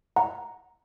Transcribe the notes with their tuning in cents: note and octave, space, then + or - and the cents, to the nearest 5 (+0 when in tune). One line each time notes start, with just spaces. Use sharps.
F#5 +0 A#5 +0